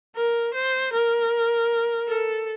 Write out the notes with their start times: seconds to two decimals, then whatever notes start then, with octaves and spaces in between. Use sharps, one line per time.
0.15 A#4
0.53 C5
0.92 A#4
2.08 A4